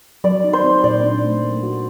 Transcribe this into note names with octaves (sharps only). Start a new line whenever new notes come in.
F#3 D5
D#4
C5
C4
A#2 D5
D4
A3
A#3
F#4